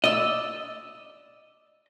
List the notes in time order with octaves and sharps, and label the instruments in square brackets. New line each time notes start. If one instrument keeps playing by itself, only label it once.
[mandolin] D5 E6 [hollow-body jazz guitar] D#5